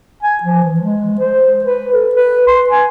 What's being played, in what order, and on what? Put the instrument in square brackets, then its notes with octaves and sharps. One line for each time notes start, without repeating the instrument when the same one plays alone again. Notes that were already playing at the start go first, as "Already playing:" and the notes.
[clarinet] G#5
F3
E3
G#3
C5
B4
A4
B4
C6
G#5